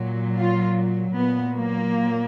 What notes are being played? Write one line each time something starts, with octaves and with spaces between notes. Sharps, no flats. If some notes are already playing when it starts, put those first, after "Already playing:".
Already playing: A#2 F#3
F4
A#2 F#3 B3
A#3